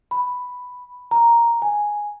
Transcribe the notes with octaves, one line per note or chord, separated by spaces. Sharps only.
B5
A#5
G#5